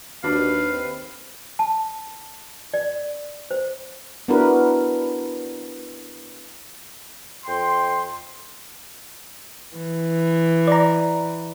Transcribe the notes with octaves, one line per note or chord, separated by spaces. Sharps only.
D#2 D4 F#4 B4 F5
C4
A5
D5
C5
B3 D4 E4 F#4 A#4 B4
F2 G5 C6
E3
D5 A#5